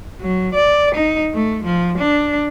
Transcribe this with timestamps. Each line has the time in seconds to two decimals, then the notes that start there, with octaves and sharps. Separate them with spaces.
0.21 F#3
0.54 D5
0.95 D#4
1.34 A3
1.64 F3
1.98 D4